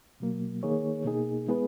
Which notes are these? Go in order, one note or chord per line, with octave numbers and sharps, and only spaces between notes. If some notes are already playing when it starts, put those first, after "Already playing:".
B2 F#3 A#3
D#3 A#3 D#4 G#4 C#5
B2 A#3 D#4 G#4
G#3 B3 E4 G#4 B4